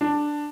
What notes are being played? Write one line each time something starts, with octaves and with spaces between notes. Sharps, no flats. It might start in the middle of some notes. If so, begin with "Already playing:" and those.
D4